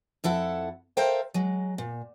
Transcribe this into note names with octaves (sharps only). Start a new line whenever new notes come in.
F2 E4 A4 F#5
A4 A#4 C5 E5 F5 G5
F#3 G#3
A#2